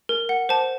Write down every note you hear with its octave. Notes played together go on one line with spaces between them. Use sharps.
A#4
F#5
C5 A5